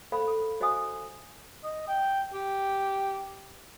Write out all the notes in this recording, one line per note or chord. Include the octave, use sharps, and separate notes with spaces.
A4 C5 F5 B5
A4
F#4 C5 D#5 F5 G#5 D#6
D#5
G5
G4